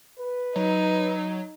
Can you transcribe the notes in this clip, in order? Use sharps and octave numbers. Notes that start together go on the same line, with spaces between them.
B4
F#3 D#4